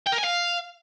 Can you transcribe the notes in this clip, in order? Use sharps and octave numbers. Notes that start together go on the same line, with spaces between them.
G5
A#4
G#5
F5